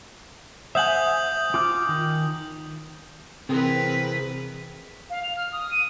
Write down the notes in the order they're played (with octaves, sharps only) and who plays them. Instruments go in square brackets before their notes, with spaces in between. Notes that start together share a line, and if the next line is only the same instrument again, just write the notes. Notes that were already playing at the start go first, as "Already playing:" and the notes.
[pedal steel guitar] C5 [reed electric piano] E5 F#5 G#5 [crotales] D#6 G6 F#7
[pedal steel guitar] F4 G#5 F6 [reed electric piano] D6
[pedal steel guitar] D#3
[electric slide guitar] C3 E3 [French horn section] C4 [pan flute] G#4 [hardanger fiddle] A#4 B4
[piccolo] F5
F7
F6
D#6
D#7